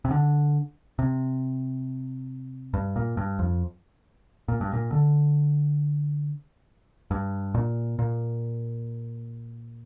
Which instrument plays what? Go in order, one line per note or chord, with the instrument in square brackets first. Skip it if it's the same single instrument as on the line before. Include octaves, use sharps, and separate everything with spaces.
[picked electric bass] C3
D3
C3
G2
A#2
G2
F2
A#2
G2
A#2
D3
G2
A#2
A#2